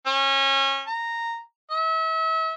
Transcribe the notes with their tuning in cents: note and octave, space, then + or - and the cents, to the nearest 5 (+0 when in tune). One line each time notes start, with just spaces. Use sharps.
C#4 -25
A#5 -10
E5 -35